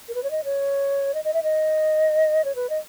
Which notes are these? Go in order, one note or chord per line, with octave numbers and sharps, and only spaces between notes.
A#4
B4
C#5
D#5
C#5
D#5
D#5
E5
D#5
C#5
B4
D#5